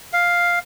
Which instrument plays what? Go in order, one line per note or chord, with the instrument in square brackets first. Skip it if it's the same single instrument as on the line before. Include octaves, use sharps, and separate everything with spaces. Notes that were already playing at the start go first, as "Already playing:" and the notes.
[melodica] F5